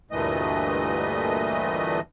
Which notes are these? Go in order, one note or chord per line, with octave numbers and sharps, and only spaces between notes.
D2 G2 A#2 E3 A3 D#5